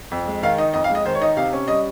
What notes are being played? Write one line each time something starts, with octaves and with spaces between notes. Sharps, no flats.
F2
G#3
D#3 F5
D#4 D#5
F2 D#5
F5
G#3
D#5
D#3 C5
C#5
D#4 D#5
C3 F5
C#4
G3 D#5